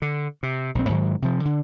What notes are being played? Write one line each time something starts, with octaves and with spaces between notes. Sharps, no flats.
D3
C3
A#1 C4
G#2 D#3 F#3
C3 F3
D3